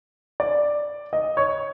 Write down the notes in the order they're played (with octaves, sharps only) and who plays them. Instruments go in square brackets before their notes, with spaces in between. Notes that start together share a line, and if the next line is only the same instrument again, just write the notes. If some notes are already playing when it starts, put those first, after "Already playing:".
[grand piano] D5
D#5
C#5